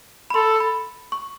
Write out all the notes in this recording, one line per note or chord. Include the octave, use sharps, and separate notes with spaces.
B5
A4 C6
B5
C#6